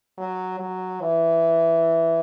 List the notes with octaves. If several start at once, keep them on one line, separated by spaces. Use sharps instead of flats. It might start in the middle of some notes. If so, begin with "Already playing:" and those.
F#3
F#3
E3